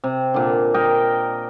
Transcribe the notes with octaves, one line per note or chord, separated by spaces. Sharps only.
C3
A#2 D3
A#4 D#5 G5